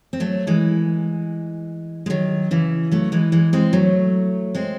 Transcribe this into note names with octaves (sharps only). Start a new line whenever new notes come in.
C4
F#3 A3
E3 G#3
G#3
D#3 F#3
C#3 E3
F#3 A3
E3 G#3
E3 G#3
G#3 C4
F#3 A3
G#3 C4